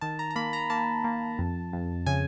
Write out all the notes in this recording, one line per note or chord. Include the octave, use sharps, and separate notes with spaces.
D#3 A5
A#5
A#5
A#3 B5
A#5
A#3 A5
A#3
F2
F2
C#3 G#5